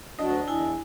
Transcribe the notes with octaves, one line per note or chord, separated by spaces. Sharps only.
D2 F#3 D4 D#5
E2 E4 G#5